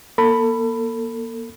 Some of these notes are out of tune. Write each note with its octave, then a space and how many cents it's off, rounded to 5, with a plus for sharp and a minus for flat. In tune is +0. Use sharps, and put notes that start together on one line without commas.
A#3 +25 A4 +40 B5 +0